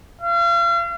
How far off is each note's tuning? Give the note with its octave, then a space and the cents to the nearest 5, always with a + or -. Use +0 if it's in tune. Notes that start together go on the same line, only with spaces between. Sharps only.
F5 -40